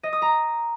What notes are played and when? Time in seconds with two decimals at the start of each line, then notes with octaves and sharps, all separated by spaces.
0.03 D#5
0.13 D#6
0.22 A#5